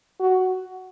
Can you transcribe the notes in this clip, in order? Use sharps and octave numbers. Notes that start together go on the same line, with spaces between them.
F#4